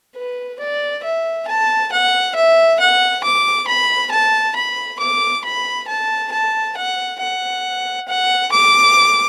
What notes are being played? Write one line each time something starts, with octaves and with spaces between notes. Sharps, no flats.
B4
D5
E5
A5
F#5
E5
F#5
D6
B5
A5
B5
D6
B5
A5
A5
F#5
F#5
F#5
D6